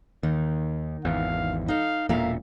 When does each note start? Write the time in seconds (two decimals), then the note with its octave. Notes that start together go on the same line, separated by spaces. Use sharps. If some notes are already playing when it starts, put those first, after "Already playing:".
0.23 D#2 D#3
1.05 G#1 E2 F5
1.68 D#4 A4 F5
2.09 E1 A#2 A#3 E5 F5 A#5